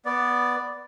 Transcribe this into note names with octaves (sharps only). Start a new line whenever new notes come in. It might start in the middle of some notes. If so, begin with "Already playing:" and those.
B3 D5